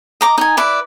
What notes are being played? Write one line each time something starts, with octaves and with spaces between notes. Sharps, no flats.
D#5 A#5 D6
D#4 G#5
E4 B4 D5